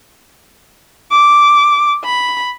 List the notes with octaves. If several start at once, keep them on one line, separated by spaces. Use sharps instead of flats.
D6
B5